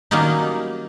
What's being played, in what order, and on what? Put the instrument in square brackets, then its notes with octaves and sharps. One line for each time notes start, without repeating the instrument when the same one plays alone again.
[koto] D#3 F#3 G3 A#3 C#4 D#4